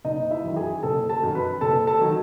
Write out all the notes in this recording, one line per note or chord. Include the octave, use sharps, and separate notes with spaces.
F#1 D#4 D#5
E4 E5
F#2 D#3 F#3
G#4 G#5
F#1 A4 A5
A4 A5
F#2 D#3 F#3
B4 B5
F#1 A4 A5
A4 A5
D#3 F#3